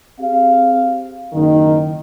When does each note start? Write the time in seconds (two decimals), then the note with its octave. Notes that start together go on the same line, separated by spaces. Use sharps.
0.19 C4 G4 G#4 F5
1.33 F#1 D#3